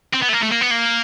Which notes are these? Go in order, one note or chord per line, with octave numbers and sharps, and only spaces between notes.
C4
B3
A3
A#3
A3
A#3
B3
A#3